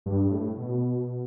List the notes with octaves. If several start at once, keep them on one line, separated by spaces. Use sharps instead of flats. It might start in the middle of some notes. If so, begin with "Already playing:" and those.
G2
G2
A2
B2